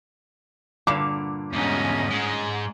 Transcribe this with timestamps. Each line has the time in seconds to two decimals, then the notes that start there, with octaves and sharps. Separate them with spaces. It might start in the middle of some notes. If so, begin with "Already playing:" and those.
0.87 G2 A#2 D3 D6
1.53 E2 G#2 C#4 D#5
2.11 G#2 G#3